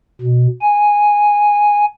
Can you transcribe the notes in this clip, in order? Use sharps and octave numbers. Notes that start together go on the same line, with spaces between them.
B2
G#5